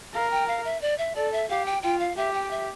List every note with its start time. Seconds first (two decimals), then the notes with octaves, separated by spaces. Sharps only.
0.13 A#4 F5
0.31 G5
0.48 F5
0.64 E5
0.82 D5
0.98 E5
1.15 A4 D5
1.32 E5
1.49 G4 F5
1.66 G5
1.83 F4 G5
2.00 F5
2.17 G4 E5
2.34 G5
2.51 E5